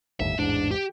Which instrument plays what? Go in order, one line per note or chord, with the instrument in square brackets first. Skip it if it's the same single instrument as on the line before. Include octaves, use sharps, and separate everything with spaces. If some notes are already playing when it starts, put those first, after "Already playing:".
[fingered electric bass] G1 D#2 A2 [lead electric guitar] E5
[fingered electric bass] A1 E2 G#2 [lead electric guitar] D4
[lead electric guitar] G4